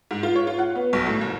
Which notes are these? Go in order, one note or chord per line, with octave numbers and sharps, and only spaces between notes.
G#2
F4
C#5
F4
F#5
B3
B1
A2
F#1